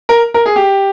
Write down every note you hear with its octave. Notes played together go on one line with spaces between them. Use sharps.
A#4
A#4
G#4
G4